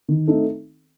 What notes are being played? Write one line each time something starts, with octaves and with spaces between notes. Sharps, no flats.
D#3
A3 C4 D#4 A4